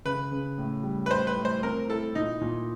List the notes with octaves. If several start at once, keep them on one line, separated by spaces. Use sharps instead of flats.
C#3 B4
C#3
A2
G3
B4
A2 C5
B4
A2
C5
C4 A#4
E4 A4
A#2 D#4
A#2